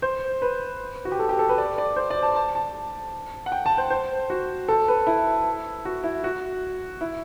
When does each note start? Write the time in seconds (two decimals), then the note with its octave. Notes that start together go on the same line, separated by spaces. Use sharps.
0.02 C5
0.42 B4
1.05 F#4
1.12 G4
1.19 A4
1.29 G4
1.39 A4
1.49 B4
1.58 D5
1.78 D5
1.96 C5
2.10 D5
2.23 A5
2.35 A5
2.55 A5
3.46 F#5
3.52 G5
3.66 A5
3.78 C5
3.90 C5
4.30 F#4
4.68 A4
4.88 B4
5.07 E4
5.85 F#4
6.04 E4
6.24 F#4
7.01 E4